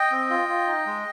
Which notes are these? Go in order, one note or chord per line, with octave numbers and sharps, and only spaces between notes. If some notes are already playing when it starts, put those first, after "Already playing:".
Already playing: D#5 G5
C4
F4
F4
D#4
G#3